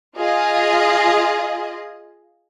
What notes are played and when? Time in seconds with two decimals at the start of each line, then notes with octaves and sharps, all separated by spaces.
0.17 F4 G#4 D#5